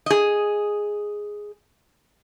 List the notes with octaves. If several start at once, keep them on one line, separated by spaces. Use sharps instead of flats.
G#4 D#5